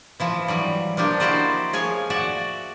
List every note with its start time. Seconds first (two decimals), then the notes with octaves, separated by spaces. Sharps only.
0.20 E3 F3 E4
0.48 E3 F#3 G3
0.97 F3 A#3 D4 G4
1.20 E4 F#4 C5 D5 D#5
1.73 F3 G#4 C#5 G#5
2.10 F#4 D5 E5 F#5